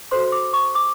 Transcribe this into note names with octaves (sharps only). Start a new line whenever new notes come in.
F#4 A4 C5 C6
D6
C#6
D6